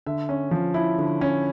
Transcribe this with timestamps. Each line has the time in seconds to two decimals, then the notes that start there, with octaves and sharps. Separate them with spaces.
0.06 D3 E5
0.29 C#4
0.51 F3
0.74 E4
0.98 D3
1.21 C#4